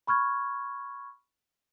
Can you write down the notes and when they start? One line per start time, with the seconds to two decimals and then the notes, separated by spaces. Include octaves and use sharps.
0.07 B5 C#6 F6 G#6